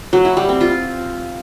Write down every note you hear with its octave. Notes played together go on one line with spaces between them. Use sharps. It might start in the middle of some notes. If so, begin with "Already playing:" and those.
F#3
E4
G3
C4
F4